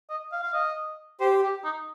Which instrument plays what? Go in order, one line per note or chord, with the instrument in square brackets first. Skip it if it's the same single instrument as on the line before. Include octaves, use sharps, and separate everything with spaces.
[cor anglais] D#5
F5
F5
D#5
[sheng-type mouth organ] G4 [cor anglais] C5
[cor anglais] G4
D#4